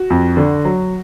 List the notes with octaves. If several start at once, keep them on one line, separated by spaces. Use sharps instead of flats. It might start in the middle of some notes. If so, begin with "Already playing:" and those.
Already playing: F#4
F2
D3
F#3